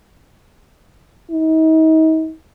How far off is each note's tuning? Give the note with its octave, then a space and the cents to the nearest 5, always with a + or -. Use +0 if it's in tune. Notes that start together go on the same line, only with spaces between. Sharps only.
D#4 +40